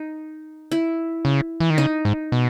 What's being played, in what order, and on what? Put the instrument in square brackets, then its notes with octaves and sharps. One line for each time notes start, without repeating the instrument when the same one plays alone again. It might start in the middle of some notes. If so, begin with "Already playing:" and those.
Already playing: [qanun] D#4
E4
[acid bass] C#3
E3
D#3
[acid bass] C#3 [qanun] D#4
[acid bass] G#2
B2